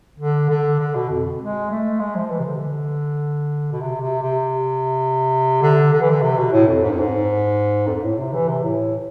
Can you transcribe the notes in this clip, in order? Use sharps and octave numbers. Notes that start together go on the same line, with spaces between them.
D3
D3
D3
B2
F2
G#3
A3
G#3
F3
E3
C3
D3
B2
C3
C3
C3
D3
D3
E3
D3
C3
B2
A2
F2
G#2
F2
G#2
F2
G#2
A2
C3
E3
C3
A2